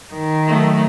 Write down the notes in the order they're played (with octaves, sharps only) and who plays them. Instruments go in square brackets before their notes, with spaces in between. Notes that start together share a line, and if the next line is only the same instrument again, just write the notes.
[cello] D#3
[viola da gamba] F#3 A3